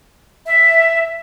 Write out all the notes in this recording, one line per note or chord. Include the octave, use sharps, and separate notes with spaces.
E5